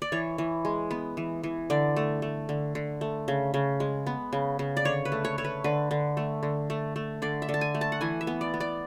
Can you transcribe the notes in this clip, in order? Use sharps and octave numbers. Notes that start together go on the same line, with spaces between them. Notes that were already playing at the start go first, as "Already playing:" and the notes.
D5
E3 C#5
E3
G#3
B3
E3
E3
D3 D5
A3
A3
D3
D3
A3
C#3
C#3
G#3
B3
C#3
C#3
D5
D3 C#5
B4
A3
C#5
A3 C#5
B4
D3 B4
D3
A3
D3
A3
A3
D3 D5
E5
D3
A5
G#5
A3
A5
F#5
E3 G#5
E5
B3
D5
B3
D5